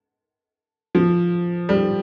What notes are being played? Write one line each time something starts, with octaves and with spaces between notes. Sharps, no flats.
F3
G3